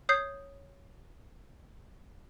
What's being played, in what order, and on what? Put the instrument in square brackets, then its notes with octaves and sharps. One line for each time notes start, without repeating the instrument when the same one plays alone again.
[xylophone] C#5 D#6 G6 C7